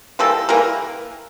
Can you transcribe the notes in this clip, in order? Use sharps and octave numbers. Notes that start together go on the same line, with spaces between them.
E3 G3 A#3 A4
E3 G3 A#3 A#4